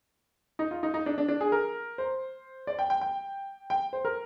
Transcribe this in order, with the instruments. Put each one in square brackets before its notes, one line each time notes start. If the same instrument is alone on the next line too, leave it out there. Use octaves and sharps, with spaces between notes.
[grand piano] D#4
F4
D#4
D#4
D4
D4
D4
G#4
A#4
C5
D5
G5
G5
G5
G5
C5
A#4